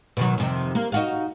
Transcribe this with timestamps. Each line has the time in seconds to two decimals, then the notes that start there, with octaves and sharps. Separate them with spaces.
0.17 B2 D#3 F#3
0.38 F2 C3 D#3
0.75 A#3
0.92 D#4 F#4 F5